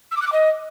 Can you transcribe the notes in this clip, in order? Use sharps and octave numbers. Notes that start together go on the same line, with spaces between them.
E6
D6
F#6
D6
D#5